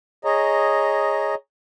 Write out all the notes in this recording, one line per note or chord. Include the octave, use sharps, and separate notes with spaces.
G#4 C#5 D#5 A#5